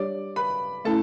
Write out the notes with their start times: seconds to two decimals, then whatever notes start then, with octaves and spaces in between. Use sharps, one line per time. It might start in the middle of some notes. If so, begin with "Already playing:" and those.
Already playing: G3 D4 G4 C#5 D5 D6
0.36 B4 B5
0.85 A3 C#4 E4 A4 A5